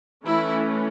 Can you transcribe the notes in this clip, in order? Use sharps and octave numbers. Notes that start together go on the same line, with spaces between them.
E3 A3 C#4 E4